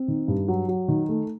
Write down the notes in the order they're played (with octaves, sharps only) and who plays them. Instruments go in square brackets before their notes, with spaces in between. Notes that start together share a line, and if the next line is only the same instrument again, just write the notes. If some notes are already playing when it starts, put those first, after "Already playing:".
Already playing: [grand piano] C4
D#3
G2
F#3
F#3
D#3
A3